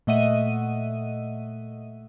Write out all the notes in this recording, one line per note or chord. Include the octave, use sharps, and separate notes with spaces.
A#2 A3 D#5 E5 F#5 D#7